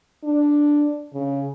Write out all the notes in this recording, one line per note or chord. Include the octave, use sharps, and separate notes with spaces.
D4
C#3